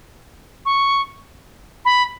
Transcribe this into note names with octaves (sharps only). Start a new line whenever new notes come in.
C#6
B5